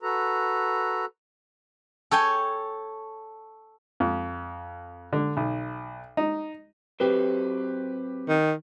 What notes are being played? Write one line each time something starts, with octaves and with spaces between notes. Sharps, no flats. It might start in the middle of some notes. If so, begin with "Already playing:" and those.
F#4 A4 B4 A#5
A4 C#5 G5 G#5
F2
D3
B1
D#4
F#3 C4 G4 B4
D#3